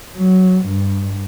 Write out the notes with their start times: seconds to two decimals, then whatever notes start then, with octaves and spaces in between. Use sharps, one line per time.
0.17 F#3
0.65 G2